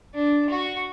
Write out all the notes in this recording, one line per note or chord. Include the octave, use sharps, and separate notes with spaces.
D4
F#4 C#6